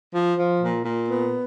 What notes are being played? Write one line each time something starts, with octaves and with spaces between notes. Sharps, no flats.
F3
F3
A#2
A#2
B3